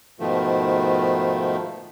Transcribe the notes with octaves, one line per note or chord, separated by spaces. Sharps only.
G#2 B2 D#3 F3 A3